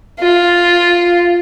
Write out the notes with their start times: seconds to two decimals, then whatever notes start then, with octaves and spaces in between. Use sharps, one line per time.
0.19 F4